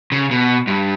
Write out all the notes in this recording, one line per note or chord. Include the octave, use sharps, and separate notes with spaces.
C#3
B2
G2